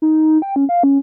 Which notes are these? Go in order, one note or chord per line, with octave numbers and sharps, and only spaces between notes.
D#4
G5
C#4
F5
C#4